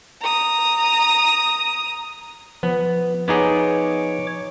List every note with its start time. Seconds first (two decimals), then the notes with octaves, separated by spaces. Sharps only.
0.22 A#5 D#6
2.63 F3 B3
3.28 B3 D#4 G#4 C#5 D6